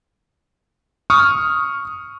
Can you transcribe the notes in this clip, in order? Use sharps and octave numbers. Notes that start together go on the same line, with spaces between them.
C#6 D#6 F6